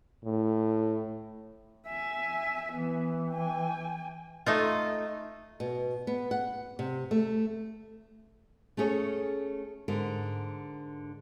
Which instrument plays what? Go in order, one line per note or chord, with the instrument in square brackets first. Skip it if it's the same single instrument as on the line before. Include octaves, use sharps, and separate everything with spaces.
[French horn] A2
[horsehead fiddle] E5 G#5
[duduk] E3 [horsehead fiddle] B3
[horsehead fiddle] G5 G#5
[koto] A3 D#4 F4
[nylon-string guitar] B2
B3
F#5
C3
A3
A3 C#4 G#4 C#5
G#2 D3 A#4